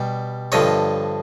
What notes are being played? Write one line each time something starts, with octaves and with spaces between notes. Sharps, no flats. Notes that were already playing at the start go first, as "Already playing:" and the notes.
Already playing: B2 G3
G2 D3 F3 C#5 D#5